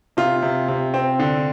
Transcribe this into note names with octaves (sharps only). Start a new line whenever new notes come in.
C3 F4
C3
C3
C4
D3